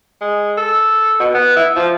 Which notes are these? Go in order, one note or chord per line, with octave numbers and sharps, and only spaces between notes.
G#3
A4
B2
B3
E4
F3